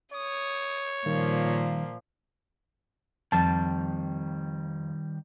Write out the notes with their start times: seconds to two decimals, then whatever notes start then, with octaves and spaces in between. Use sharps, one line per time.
0.13 C#5 D#6
1.06 A#2 D#3 F3 G3 A#3
3.32 F2 D#3 G3 A5